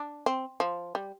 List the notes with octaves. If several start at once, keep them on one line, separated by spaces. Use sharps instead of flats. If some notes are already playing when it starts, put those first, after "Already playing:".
Already playing: D4
C4
F3
G3